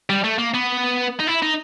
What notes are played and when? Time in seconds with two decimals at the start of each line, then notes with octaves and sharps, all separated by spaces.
0.10 G3
0.24 A3
0.38 A#3
0.54 B3
1.20 D#4
1.27 E4
1.43 D#4